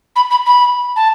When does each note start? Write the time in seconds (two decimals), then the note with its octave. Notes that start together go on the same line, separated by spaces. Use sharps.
0.16 B5
0.30 B5
0.46 B5
0.96 A5